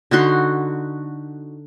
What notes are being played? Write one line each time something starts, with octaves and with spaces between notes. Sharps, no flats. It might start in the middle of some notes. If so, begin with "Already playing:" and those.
D3 D#4 F#4 C6